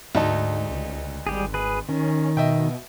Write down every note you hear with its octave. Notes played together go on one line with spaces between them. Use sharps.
D2 G#2 D#4 A5
C#2
G#1 G3 G4 G#4
G#4 B4
D#3 C#4
B2 D#5 E5 G5